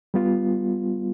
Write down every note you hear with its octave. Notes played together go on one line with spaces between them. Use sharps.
G3 B3 F4